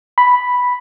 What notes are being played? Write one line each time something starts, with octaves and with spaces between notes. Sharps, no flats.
B5